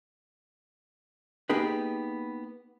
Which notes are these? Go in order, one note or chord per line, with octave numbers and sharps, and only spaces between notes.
A#3 B3 D#4 G4 G#4 B4